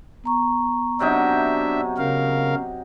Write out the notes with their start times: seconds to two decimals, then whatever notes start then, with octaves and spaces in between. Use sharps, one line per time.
0.24 B3 A#5 C#6
1.00 C3 F#3 D4 D#4 E5
1.97 C#3 A#4 F5